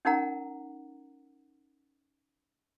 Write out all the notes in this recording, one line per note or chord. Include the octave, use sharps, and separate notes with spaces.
C#4 D#4 A#4 F#5 A#5